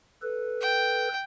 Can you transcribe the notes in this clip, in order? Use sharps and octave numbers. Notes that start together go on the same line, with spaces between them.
A4 B4
G5